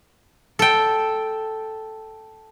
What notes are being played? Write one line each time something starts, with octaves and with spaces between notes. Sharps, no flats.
A4 G5